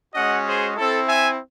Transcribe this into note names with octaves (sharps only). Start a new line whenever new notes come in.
G#3 C#4 F#4 D#5 F#5
G#4 C5
C4 E4 A4
E5 G#5